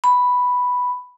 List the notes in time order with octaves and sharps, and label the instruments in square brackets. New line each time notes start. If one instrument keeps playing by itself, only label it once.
[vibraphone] B5